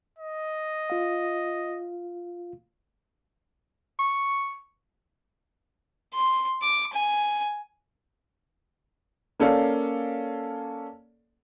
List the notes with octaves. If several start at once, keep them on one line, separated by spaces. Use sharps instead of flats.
D#5
F4 F5
C#6
C6
D6
G#5
A#3 C#4 A4 D5 F5